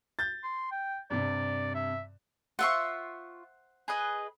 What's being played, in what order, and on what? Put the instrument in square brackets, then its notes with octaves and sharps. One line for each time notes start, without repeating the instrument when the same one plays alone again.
[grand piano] G6 A6
[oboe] C6
G5
[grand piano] G2 C3 [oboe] D5
[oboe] E5
[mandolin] F4 C#6 [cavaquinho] C5 E5 F#5
[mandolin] G#4 B4 D#5